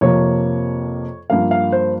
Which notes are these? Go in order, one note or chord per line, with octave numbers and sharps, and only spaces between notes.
F2 C3 F3 A#3 C#5
G2 F3 A#3 F5
F5
C5